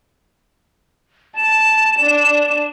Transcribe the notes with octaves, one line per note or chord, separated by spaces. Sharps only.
A5 E7
D4